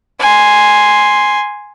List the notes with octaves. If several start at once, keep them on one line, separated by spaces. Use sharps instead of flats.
G#5 C6